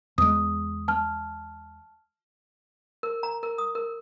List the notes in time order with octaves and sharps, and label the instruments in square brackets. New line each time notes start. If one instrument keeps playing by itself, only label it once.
[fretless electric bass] E2 G#3 [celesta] D#6
[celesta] A5 F6
[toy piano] A#4
A#5
A#4
D#6
A#4